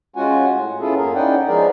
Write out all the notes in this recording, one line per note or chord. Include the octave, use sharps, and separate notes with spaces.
G#3 C#4 F4 F#4 F#5 G#5
A2
B3 C#4 E4 F4 G#4 A4
F#2 A#3 G#4 A#4
C#4 D#4 E4 D5 F#5 G5
F3 G#3 B3 G#4 A#4 D5